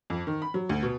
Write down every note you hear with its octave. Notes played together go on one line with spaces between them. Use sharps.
F2
D#3
B5
F#3
D2
B2